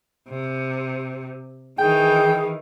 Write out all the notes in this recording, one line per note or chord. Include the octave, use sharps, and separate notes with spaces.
C3
D#3 E3 G#4 G5